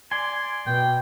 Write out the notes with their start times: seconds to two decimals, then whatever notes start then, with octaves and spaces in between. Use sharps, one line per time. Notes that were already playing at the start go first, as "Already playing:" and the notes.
0.12 D5 G#5 C6
0.67 B2 G5